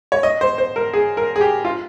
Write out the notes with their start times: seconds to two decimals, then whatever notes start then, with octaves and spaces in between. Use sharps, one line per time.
0.12 C#5
0.23 D#5
0.41 C5
0.58 C5
0.76 A#4
0.94 G#4
1.17 A#4
1.36 G#4
1.41 G4
1.65 F4